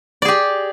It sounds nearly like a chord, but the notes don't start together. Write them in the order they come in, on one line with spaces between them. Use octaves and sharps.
D5 G#4 G4